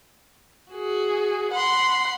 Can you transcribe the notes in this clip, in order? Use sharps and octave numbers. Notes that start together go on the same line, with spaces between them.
F#4 G#4
F#5 B5 C6